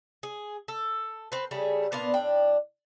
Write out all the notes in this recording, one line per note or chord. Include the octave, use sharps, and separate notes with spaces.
G#4
A4
C4 B4
C#3 G3 A3 G#4
A#2 B3 D4 F5
A2 D4 G5